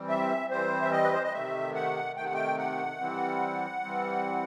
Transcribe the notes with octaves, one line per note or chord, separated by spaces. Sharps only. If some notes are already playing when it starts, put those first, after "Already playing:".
Already playing: E3 G3 C4
E5
E3 G3 C4 C5
E5
D#5
B4
C5
D#5
C3 D#3 A3 E5
F#5
C3 D#3 A3 G5
F#5
G5
F#5
E3 G3 C4
E3 G3 C4